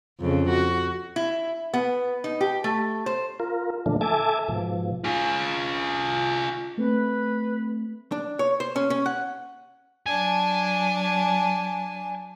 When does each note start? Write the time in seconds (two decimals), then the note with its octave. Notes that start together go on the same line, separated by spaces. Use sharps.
0.20 F2 C#3
0.49 F#4
1.16 E4
1.74 B3
2.24 D#4
2.41 G4
2.64 A3
3.06 C5
3.40 F4 A#4
3.86 A#2 D3 E3 F3 A3 D4
4.01 A4 E5 G#5 A5 D6
4.48 G#2 B2 F3
5.04 F4 G#4
6.78 A3 C4 B4
8.12 D4
8.39 C#5
8.60 C5
8.76 C#4
8.90 C#4
9.06 F#5
10.06 F#3 D4 G#5 A5